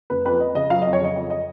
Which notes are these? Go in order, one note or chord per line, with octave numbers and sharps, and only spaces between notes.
F#1 B4
F2 B4
F2 D#5
C#3 D#5
F#3 F5
F2 D#5
C#5
C#3 D#5
F2
D#5